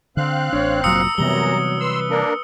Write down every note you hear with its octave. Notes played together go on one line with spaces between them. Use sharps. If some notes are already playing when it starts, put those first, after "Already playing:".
D3 C4 F5 F#6
A1 D4 C#5
F1 A#2 F#3 A#5 D#6 E6 C#7
F#2 C3 E3 F#3 G3 B3 A#5 G7
B4 C6 E6
A#3 D4 A#4